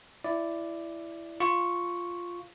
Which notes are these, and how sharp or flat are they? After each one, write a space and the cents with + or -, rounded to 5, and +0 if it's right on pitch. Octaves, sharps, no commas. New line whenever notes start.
E4 +15 D5 +0
F4 +0 C#6 +0